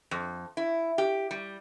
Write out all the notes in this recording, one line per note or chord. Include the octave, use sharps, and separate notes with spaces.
F2
E4
G4
G3